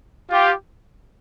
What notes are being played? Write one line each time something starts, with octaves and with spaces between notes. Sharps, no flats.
F4 G4